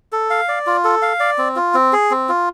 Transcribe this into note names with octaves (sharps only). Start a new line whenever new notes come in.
A4
F5
D5
F4
A4
F5
D5
C4
F4
C4
G#4
C4
F4